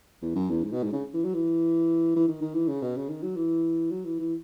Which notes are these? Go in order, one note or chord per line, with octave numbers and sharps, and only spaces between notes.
E2
F#2
E2
G#2
B2
G#2
C#3
E3
F#3
E3
E3
D#3
D#3
E3
C#3
B2
C#3
D#3
F#3
E3
F#3
E3
E3